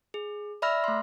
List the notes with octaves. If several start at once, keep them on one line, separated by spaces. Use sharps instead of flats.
G#4
D5 E5 B5 E6 F6 A#6
A3 C6